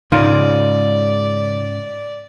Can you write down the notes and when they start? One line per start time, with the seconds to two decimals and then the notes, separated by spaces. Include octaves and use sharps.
0.12 C#2 G#2 C#3 D#4 F4 D5